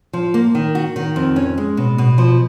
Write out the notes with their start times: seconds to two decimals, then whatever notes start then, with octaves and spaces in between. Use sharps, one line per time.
0.13 F3
0.34 A#3
0.55 D#3
0.75 F#4
0.96 D#3
1.16 F2
1.36 C#4
1.58 G#3
1.77 B2
1.98 B2
2.18 F3